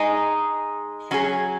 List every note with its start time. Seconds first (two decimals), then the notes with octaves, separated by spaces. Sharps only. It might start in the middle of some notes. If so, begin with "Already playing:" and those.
Already playing: G#3 D#4 G#4
1.11 F#3 C#4 G#4